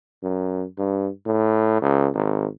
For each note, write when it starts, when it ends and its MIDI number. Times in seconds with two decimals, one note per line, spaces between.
0.23 0.64 42
0.78 1.08 43
1.26 1.79 45
1.82 2.08 37
2.14 2.46 32